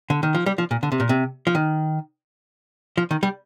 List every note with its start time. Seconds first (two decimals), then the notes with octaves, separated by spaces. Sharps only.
0.10 D3
0.23 D#3
0.35 F3
0.46 G3
0.58 F3
0.71 A#2
0.83 D3
0.92 C3
1.00 A#2
1.09 C3
1.47 F3
1.55 D#3
2.98 F3
3.11 D#3
3.23 G3